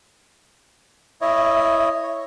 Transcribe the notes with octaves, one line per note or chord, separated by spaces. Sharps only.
E4 C#5 D#5 E5
C#5